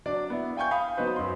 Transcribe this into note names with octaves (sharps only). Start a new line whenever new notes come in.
F#3 D4 D5
B3 E4
F5 G5 G#5 C#6 G6
F5 B5 D#6
F#3 B3 D#4 B4 C5
F#2 C6